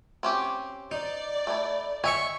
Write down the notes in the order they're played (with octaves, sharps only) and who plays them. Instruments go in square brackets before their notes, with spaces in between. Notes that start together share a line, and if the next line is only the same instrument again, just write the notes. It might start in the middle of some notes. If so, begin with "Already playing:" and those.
[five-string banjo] C4 C#4 G4
[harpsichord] D#4 [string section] D5
[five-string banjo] A3 E4
[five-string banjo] C#5 G#5 [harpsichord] D#5 E5 C#6